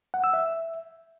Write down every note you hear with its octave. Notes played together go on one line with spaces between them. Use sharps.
F#5
E6
E5